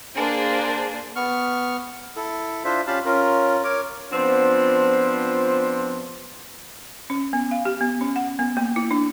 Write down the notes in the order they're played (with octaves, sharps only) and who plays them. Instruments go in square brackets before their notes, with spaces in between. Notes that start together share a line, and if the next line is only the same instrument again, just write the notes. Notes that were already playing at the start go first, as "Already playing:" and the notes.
[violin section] A#3 D4 G#4 C5
[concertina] B3 C#6 F6
E4 A4
D4 F4 C5 E5
C#4 F4 G4 F5 A5 B5
C#4 F4 A#4
A#4 C#5 D6
[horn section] F3 B3 C4 D4 F4
[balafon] C#4
B3
F5
G4
B3
C#4
F#5
B3
A#3
E4
D4